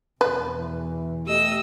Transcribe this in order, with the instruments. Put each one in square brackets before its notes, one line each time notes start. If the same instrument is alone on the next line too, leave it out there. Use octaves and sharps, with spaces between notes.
[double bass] E2 B2 [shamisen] B4
[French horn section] E3
[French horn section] A3 G4 [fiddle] D#5 E6